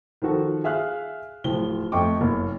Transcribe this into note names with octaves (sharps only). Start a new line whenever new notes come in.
D#3 F3 F#4 A4
G#4 E5 F5 F6 F#6
D1 F3 G7
F2 A3 D#5 G5 C#6 D6
F#1